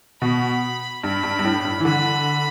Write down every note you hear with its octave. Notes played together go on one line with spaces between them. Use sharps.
B2 B5
G2 B5
G2
G2
A2
G2
E3
D3 B5